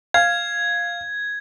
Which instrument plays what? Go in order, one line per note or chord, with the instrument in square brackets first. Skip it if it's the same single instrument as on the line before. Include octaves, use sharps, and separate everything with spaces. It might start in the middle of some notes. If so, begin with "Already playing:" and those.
[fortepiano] F5 [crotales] G#6